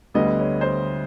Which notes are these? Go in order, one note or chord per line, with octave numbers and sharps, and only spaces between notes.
D2 D3 G3 B3 D#5
C#5
C5